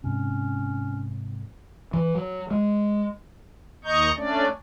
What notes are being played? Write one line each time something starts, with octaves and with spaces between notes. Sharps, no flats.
G#2 C3 C#4
E3
F#3
G#3
D#2 D#5 A#5 C#6 G6
A3 C#4 D4 D5